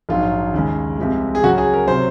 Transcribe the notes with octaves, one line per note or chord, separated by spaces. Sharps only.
A#1 G#2 F#3 F4
D#2 C#3 G#3
C2 C3 F3 G#3
G#4
C#2 C#3 F#3 F#4
G#4
A#4
C3 F#3 C5